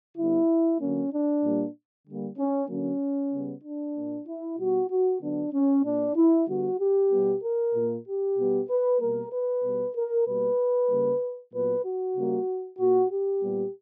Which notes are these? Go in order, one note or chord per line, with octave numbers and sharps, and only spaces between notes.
D3 G3 B3 E4
D3 F#3 A#3 C#4
D4
A#2 G3 A#3
D3 G3 A#3
C#4
D3 F#3 A#3 C#4
C#3 G3 B3
D4
A#2 A#3
E4
B2 G3 B3 F#4
F#4
D3 F#3 B3 D4
C#4
A#2 A#3 D4
E4
D3 G3 B3 F#4
G4
B2 G3 B3
A#4
A#2 A#3
G4
B2 G3 B3
B4
B2 G3 A#3 A#4
B4
B2 G3 B3
A#4
B2 G3 A#3 B4
C#3 G3 A#3
A#2 F#3 B3 B4
F#4
C#3 G3 A#3
A#2 A#3 F#4
G4
A#2 G3 B3